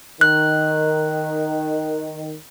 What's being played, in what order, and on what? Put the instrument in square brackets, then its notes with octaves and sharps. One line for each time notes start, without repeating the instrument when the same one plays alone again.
[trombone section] D#3 [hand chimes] F#6